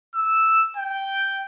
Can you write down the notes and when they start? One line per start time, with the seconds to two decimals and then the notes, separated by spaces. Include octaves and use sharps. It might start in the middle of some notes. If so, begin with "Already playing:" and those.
0.15 E6
0.77 G5